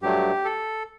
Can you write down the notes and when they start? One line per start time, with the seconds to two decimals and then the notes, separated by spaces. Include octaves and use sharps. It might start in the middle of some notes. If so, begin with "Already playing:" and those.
0.02 G2 F#3 A3 G4
0.45 A4